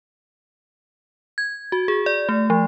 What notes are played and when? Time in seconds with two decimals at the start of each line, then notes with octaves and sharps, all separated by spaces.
1.38 G#6
1.72 F#4
1.88 G#4
2.06 D5
2.29 A3
2.50 F3